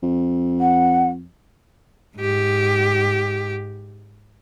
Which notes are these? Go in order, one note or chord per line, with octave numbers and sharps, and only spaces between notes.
F2
F#5
G#2 G4